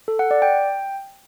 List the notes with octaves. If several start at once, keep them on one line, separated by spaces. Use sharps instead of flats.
A4
F#5
D5
G5